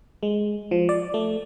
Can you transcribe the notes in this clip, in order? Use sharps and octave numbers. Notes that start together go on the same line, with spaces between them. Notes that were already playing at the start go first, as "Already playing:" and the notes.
G#3
F3
D5
A3